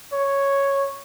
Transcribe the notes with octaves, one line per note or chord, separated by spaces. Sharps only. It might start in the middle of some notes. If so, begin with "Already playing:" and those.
C#5